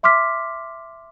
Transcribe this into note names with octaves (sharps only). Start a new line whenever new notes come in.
E5 C6 D6 F6 B6